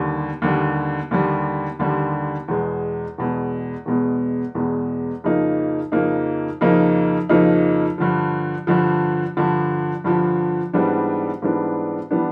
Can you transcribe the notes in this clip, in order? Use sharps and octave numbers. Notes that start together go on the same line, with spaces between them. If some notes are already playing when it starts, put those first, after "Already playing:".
Already playing: D#2 D3 G3
D#2 D3 G3
D#2 D3 G3
D#2 D3 G3
E2 B2 G#3
E2 B2 G#3
E2 B2 G#3
E2 B2 G#3
F2 C#3 F3 A#3 D#4
F2 C#3 F3 A#3 D#4
F2 C#3 F3 A#3 D#4
F2 C#3 F3 A#3 D#4
G2 D3 F3
G2 D3 F3
G2 D3 F3
G2 D3 F3
G#2 E3 G3 B3 D4
G#2 E3 G3 B3 D4
E3 G3 B3 D4